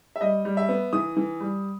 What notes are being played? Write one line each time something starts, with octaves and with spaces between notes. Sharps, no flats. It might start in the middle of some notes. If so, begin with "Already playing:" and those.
E5
G3 D#5
G3
E5
B3
E3 D#6
E3
G3